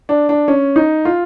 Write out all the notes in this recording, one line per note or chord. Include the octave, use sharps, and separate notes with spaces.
D4
D4
C#4
D#4
F4